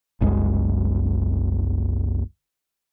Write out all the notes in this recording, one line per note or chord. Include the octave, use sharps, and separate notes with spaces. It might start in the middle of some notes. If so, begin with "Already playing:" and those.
F#1 C2 F#2 G#3